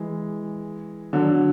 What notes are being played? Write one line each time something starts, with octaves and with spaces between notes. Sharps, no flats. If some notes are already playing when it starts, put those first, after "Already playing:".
Already playing: E3 G#3
D3 F#3